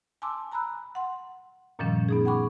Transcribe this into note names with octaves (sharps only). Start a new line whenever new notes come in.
G#5 A5 C6 D6 E6
G#5 A#5 B5 E6 F#6
F#5 C6
F#2 A#2 D#3 F3 G3 C#4
B3 D#4 G#4
F#5 G5 B5 C#6 D6